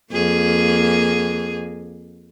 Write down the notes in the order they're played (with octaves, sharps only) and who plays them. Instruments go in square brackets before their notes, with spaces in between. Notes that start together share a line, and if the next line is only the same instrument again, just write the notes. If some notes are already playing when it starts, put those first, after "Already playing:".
[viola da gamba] F2 A#3 G#4